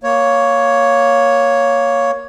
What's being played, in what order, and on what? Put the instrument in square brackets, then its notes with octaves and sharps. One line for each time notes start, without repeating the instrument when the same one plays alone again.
[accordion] A#3 C#5